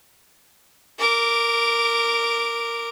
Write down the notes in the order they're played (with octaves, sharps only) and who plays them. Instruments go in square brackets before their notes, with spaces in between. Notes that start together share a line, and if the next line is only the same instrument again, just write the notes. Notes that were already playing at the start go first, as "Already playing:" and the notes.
[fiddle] A#4 D6